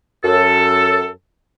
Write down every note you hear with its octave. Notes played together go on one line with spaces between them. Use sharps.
F#2 A4